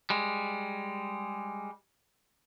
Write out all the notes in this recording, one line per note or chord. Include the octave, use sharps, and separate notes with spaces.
G3 G#3